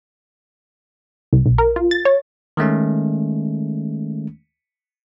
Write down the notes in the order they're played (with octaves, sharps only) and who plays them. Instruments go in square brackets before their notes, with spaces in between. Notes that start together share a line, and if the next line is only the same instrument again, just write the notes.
[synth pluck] C2
B1
A#4
F4
A6
C#5
[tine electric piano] D#3 G#3 A3 C#4